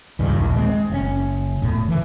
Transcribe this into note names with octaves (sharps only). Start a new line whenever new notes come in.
C#2 G2 D#3
A#1 D#2
G#3 C4
F#1 C3 C#4
E1 A2
D3 E3